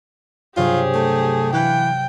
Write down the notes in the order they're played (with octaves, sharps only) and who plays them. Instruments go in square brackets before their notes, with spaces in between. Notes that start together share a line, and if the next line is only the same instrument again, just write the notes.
[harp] G2 C3 F#3 [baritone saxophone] F4 [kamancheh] G4 G#4
[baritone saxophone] A3
[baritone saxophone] E3 [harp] F5 F#6 C#7 [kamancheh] G5